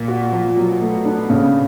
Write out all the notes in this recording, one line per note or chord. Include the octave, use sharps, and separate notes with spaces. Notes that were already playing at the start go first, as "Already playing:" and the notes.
Already playing: A#2
F#4
F3
B2 F#3
A3
D4
C#3